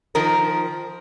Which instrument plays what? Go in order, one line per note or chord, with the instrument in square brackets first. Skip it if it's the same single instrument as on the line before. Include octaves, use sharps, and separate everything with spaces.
[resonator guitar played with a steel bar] D#3 F3 A#4